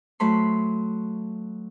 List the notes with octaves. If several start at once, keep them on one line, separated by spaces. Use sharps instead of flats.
F#3 A3 B5 C6